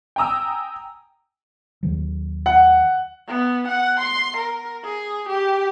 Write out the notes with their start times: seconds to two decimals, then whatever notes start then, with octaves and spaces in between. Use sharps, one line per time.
0.16 G5 G#5 A#5 D#6 E6
1.83 D#2 D#3 F#3
2.46 F#5
3.28 B3
3.68 F#5
4.00 C6
4.37 A#4
4.84 G#4
5.29 G4